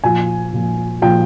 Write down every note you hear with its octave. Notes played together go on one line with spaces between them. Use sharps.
A#2 F3 G#5
A#2 F3
A#2 F3 G5